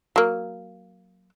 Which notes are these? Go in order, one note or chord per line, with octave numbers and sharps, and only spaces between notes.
F#3 A#3